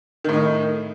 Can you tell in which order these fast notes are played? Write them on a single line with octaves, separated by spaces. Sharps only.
D#3 A2 D#4